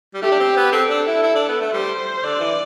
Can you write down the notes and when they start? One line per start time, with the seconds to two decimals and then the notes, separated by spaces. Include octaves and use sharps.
0.14 G3
0.22 A3 G4
0.32 D4
0.40 C4
0.57 B3
0.72 C4 A4
0.90 D4
1.07 E4
1.23 E4
1.35 D4
1.49 B3
1.61 A3
1.73 G3 C5
2.24 D3 D5
2.40 E3